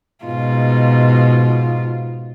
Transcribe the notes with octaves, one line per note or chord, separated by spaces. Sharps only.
G#2 B2 F4